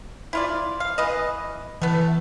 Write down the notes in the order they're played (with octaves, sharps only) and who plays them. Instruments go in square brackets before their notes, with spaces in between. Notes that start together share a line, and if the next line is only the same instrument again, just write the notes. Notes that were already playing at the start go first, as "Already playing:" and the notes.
[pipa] E4 F4 D5
F5
E3 B4 D#5
[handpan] E3 [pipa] A3 B3